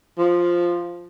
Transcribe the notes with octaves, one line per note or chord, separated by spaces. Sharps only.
F3